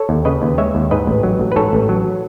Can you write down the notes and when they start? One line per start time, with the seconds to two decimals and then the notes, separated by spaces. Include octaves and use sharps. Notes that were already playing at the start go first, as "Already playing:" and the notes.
Already playing: A4 C#5
0.09 D#2
0.25 C#3 B4 D#5
0.42 D#2
0.58 G#3 C#5 E5
0.75 D#2
0.91 G#2 B4 D#5
1.07 A1
1.23 F#3
1.39 A1
1.52 B4
1.56 G#2 A4 C#5
1.73 A1
1.89 F#3